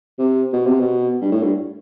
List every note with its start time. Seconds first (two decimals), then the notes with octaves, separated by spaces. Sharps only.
0.19 C3
0.53 B2
0.66 C3
0.80 B2
1.21 G2
1.31 A2
1.42 G2